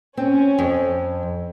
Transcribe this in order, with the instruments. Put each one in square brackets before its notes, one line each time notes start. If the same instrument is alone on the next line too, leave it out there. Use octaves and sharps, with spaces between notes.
[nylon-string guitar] C4 [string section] C#4
[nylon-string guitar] F2